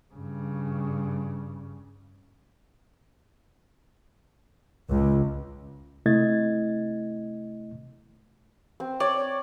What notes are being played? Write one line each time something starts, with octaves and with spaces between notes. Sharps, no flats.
G2 C#3
C#2
C3 A3 E4 D#5 G#6 A6
C4
C#5 D5